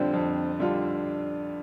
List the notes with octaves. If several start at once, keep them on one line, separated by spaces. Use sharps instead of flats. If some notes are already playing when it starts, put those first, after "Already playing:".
Already playing: F2 D3 G3 C4 D4 F4
F2
D3 G3 D4 F4